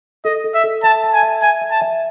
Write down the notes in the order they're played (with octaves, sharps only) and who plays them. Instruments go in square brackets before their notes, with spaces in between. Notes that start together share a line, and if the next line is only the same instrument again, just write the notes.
[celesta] A4 [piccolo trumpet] D#5
[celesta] A4
[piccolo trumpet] E5
[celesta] A4
[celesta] E5 [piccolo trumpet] A5
[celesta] A5
[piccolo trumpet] G#5
[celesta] E5
[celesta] E5 [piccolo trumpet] G#5
[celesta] E5
[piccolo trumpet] A5
[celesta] E5